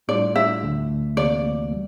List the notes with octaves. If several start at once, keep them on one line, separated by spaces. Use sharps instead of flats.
A2 G3 D4 F4 D5
E5
D2 D3 A3
D2 C3 E3 A#3 D5
G3